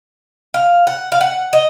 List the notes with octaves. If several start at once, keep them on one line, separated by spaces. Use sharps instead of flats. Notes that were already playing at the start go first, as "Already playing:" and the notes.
F5
F#5
F5
F#5
D#5